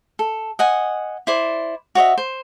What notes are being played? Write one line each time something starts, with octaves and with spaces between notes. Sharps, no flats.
A4
D#5 F#5 G#5
E4 C5 D5
F#4 C#5 D#5 E5
C5